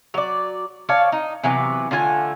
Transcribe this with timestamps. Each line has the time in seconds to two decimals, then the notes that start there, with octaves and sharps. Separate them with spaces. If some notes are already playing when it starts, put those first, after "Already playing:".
0.14 F#3 D5
0.89 C#5 D5 F5 A5
1.12 D#4
1.44 C3 E3 F#3 B3
1.91 D3 A3 F4 G#5